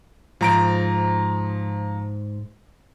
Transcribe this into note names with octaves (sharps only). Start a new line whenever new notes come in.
G#2 F3 A#5 D7